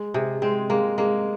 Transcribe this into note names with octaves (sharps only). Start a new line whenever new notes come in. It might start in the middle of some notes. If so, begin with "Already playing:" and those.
Already playing: G#3
C3 G#4
G#3 C4
G#3 A#3
G#3 A#3